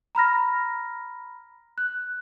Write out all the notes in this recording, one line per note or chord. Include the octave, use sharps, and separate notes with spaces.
A#5 B5 F6 A#6
F#6